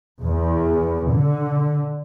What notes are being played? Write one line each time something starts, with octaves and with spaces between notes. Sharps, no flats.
E2
D3